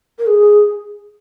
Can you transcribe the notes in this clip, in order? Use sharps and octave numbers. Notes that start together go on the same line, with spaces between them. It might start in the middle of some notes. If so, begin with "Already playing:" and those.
A#4
G#4